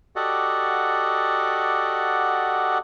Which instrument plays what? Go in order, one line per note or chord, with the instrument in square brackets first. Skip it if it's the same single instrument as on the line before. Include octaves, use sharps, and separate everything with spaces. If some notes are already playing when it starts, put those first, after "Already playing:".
[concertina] F#4 G4 A4 D5 D#5 F#5